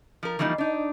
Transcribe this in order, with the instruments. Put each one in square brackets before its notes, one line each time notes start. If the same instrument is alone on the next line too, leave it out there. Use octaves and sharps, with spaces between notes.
[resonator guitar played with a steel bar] F3 A#4
E3 F3 G3 A#3 D#4
D4 D#4